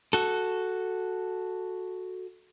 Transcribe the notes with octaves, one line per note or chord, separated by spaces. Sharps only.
F#4 A4